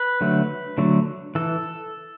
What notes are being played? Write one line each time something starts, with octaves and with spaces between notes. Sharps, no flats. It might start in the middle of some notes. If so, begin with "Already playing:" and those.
Already playing: B4
D3 F#3 A3
D3 F#3 A3
E3 A4